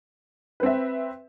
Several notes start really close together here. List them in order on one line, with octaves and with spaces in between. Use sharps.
B4 C4 E5